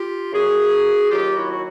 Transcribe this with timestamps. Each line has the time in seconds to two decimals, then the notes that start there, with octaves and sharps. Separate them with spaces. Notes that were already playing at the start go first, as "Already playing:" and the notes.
Already playing: F4 G4
0.32 F#2 C#3 F#3 F#4 G#4
1.10 D#2 D#3 F#3 F4 G4
1.36 E4 F#4
1.50 F#4